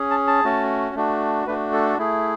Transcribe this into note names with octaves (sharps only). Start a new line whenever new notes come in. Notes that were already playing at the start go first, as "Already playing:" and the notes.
Already playing: C#4 G#4
A5
A5
A3 C#4 F#4
A3 D4 F#4
A3 D4 F#4 B4
A4
A3 E4 G#4